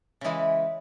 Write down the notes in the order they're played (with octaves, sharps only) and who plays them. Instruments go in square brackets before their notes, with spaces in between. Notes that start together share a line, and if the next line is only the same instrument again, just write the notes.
[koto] C#3 E3 G#3 E4